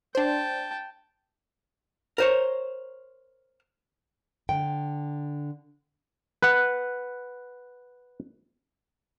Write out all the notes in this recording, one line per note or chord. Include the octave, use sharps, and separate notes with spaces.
D4 C5 G5 A5
A#4 C5 C#5
D3 G5
B4 F#5